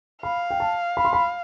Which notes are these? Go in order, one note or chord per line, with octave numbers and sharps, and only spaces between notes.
F5 B5
G5
A5
B5
C6
B5